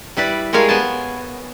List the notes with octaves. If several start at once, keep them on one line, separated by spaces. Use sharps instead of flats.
G3 E4 B4 D5
G3 G#3 G#4 A#4 C#5 F5
B3 G#5 A5